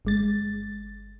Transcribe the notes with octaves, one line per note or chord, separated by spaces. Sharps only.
G1 G#3 A6